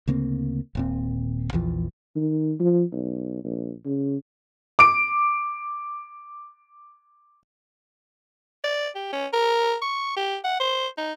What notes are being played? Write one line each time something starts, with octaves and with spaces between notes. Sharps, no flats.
D2 C#3 A#3 C4
D#1 A#2 C4
A#1 E2 E3 F3
D#3
F3
B1
A#1
C#3
D6 D7
D5
G4
C#4
A#4
C#6
G4
F#5
C5
D#4